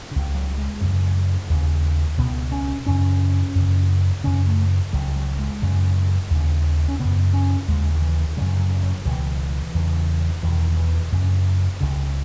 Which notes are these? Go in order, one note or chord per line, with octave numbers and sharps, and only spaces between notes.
C#2 C#3
F#3
G#3
F#2 C#3
D#2 C#3
C#2 B2 B3
C#4
F#2 C#3 C#4
F#2 C#3
F#2 C#3 C#4
A3
C#2 C#3 F#3
F#3
G#3
F#2 C#3
D#2 C#3
C#4
F#2 C#3 B3
C#4
D#2 C#3 G#3
D#3
E3
F#2 C#3 F#3
F#3
F#3
C#2 B2 E3
E2 C#3
E2 B2 D#3
E3
F#2 C#3
C#2 C#3